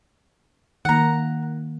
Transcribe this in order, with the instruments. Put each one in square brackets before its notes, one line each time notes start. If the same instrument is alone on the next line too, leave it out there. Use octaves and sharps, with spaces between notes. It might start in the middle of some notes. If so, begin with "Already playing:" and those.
[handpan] D#3 A#3 [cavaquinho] F#5 A#5